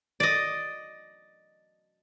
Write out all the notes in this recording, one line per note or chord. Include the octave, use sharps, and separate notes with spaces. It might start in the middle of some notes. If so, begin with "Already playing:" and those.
D5 D#5